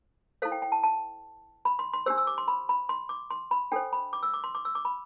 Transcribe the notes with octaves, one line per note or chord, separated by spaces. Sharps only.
E4 A4 C5 F5
G5
G5
A5
A5
B5
C6
C6
D4 G4 C5 E6
E6
D6
C6
B5
B5
C6
D6
C6
B5
D4 A4 C5 G5
B5
D6
E6
D6
C6
D6
E6
D6
B5